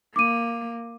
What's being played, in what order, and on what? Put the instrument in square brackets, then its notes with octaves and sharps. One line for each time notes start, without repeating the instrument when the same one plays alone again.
[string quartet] A#3 [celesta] D6 D#7